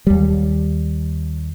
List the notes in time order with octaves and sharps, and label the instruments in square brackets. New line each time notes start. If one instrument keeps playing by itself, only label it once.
[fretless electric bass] D#2 G3